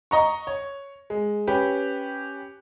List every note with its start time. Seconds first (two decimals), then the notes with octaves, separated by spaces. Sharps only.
0.11 D#5 A#5 C#6
0.47 C#5
1.10 G#3
1.47 C#4 G4 B4